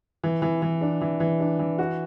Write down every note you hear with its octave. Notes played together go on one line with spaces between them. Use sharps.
E3
E3
E3
D4
E3
E3
D4
E3
F#4